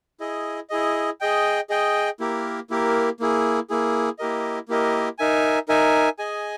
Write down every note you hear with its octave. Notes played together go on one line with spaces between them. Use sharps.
E4 G#4 D#5
E4 G#4 D#5
G#4 D#5 G5
G#4 D#5 G5
A#3 E4 G4 A#4
A#3 E4 G4 A#4
A#3 E4 G#4
A#3 E4 G#4
A#3 E4 G4 A#4 D#5
A#3 E4 G4 A#4 D#5
D#4 A#4 E5 G#5
D#4 A#4 E5 G#5
G#4 D#5 G#5